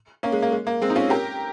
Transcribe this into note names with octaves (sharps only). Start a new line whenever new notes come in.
A#3 C#4
G#3
A#3
G#3
A#3
G#3 C4
D#4
C#4 F4
G4 A#4